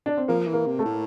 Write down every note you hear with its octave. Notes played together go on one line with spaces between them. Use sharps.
D4
C4
F3 A#3
E3
A#3
C3
A3
A2